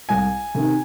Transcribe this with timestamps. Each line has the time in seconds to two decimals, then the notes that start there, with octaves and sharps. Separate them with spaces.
0.09 C2 G#5
0.55 C3 D#3